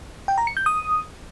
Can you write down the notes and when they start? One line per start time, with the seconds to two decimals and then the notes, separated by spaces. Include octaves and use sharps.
0.28 G5
0.38 A#5
0.47 C#7
0.57 G6
0.66 D#6